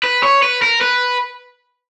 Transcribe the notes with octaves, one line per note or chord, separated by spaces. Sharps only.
B4
C#5
B4
A#4
B4